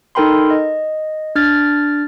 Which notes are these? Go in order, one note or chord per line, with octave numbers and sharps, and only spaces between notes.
D#4 A4 A#4 G5 B5 C6
D#5
D4 F6 A6